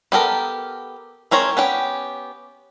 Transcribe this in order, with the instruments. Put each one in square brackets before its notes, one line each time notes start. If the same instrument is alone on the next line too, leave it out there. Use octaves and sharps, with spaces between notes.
[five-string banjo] B3 G4 A4 A#4
G#3 C4 A#4 C#5 A#5
B3 C#4 G4